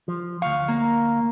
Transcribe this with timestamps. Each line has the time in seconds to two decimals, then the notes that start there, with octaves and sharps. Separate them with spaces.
0.08 F3
0.42 D2 F5 C#6
0.68 A#3